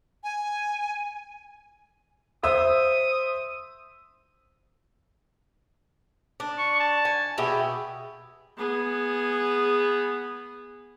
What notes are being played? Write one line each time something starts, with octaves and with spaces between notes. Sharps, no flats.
G#5
C5 E5 D#6 E6
D4
C#6
A5
G#5
B2 G4 G#4 E5
B3 G#4